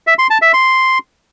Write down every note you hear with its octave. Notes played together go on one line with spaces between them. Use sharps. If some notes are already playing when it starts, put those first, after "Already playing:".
E5
C6
A5
E5
C6